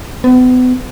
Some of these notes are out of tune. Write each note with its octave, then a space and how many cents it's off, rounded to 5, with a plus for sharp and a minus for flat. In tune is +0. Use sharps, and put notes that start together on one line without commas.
B3 +35